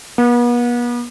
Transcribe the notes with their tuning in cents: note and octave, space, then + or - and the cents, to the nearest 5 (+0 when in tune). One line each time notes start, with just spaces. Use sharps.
B3 -40